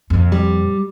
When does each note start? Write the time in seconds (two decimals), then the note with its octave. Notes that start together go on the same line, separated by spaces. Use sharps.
0.10 F2 A#2
0.32 G3